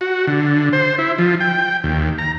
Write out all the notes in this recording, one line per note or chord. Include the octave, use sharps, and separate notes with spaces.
F#4
D3
C5
E4
F3
G5
D#2
A#5